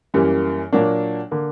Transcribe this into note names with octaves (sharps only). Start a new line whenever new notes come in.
F#2 E3 G3 A#3
A#2 F#3 A#3 D4
D3 A#3